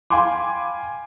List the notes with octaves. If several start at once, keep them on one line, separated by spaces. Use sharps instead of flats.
F5 G5 G#5 B5 C6 D6